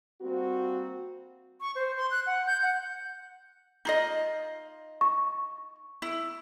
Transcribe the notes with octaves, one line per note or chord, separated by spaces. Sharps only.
G3 A#3 C4 F#4
C#6
C5
C6
F#6
F#5
G6
F#5
D#4 F4 D#5
C#6
E4